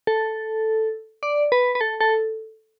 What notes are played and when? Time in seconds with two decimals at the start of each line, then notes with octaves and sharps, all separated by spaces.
0.07 A4
1.23 D5
1.52 B4
1.75 B4
1.81 A4
2.01 A4